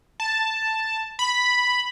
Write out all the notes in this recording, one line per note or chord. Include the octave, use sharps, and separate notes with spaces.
A5
B5